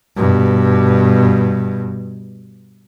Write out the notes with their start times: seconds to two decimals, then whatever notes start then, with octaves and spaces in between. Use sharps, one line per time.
0.17 G2 B2